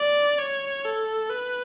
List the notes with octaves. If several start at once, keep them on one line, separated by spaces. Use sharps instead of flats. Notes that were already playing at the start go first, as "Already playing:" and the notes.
Already playing: D5
C#5
A4
B4